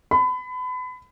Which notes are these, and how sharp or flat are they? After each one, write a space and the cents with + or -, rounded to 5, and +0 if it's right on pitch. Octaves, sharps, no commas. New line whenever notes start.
B5 +30